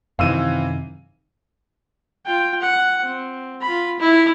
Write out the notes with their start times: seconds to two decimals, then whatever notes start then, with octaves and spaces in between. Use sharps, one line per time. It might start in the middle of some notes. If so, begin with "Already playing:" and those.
0.19 F#2 C3 D#3 E3 C4 F5 E6 D#7
2.25 F4 G5
2.61 F#5
3.02 C4
3.61 F4 B5
3.99 E4